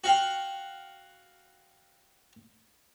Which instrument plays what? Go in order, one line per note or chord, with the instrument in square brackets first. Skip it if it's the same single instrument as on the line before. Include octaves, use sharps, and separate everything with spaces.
[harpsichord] F#4 F5 G5